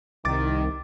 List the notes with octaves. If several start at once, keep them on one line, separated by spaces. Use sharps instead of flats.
C2 D#3 D6 A6